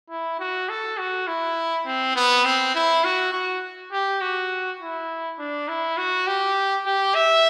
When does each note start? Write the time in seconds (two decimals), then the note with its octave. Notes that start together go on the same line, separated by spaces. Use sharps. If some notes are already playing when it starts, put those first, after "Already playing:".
0.10 E4
0.39 F#4
0.69 A4
0.98 F#4
1.27 E4
1.86 C4
2.16 B3
2.45 C4
2.75 E4
3.04 F#4
3.33 F#4
3.92 G4
4.21 F#4
4.80 E4
5.39 D4
5.68 E4
5.97 F#4
6.27 G4
6.86 G4
7.15 E5